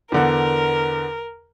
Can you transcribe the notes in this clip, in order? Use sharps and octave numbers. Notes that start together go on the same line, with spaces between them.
E2 D3 A#4 F#5